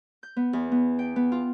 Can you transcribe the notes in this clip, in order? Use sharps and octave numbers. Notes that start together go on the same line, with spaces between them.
G6
B3
E2
B3
G5
B3
F4